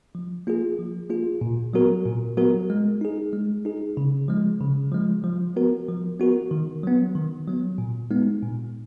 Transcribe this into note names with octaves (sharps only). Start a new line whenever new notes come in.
F3
A#3 F4 G#4
F3
A#3 F4 G#4
A#2
F#3 B3 F#4 A#4
A#2
F#3 B3 F#4 A#4
G#3
D#4 G#4
G#3
D#4 G#4
C#3
F3 G#3
C#3
F3 G#3
F3
B3 F#4 A#4
F3
B3 F#4 A#4
D#3
F#3 B3
D#3
F#3 B3
A#2
G#3 B3 D#4
A#2